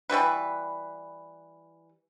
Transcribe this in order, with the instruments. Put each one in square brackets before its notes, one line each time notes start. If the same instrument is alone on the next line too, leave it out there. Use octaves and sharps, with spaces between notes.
[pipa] E3 G3 F#4 B4